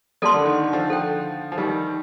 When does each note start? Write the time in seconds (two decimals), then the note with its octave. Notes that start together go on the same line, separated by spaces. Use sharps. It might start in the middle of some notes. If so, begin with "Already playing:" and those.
0.22 G3 A#3 A4 D5 A5 C6
0.34 D3
0.45 D#3
0.73 D3 F3
0.90 A4 C5 G5
1.52 F3
1.57 D#3 G3 D#4 G4 A#4